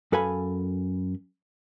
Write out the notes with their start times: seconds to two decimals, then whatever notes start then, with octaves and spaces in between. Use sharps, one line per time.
0.12 F#2 A4 B4 F5 G#5 B5